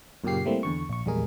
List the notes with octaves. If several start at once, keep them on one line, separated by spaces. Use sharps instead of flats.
F#2 A#2 C#3 A#3 G4 C7
G3 A3 A#3 C4 E4
E2 D3 C#6
A#1 C#6
A#1 E2 G3 G#3 G#4 A#4